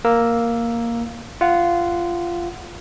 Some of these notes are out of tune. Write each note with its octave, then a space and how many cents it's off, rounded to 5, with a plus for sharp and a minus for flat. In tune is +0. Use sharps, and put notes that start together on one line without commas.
A#3 +0 A#4 +0 E6 +0
F4 -15 F#5 +0